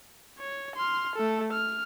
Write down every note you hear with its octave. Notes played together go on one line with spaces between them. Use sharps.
C#5
C6 F6
A3 A4
F6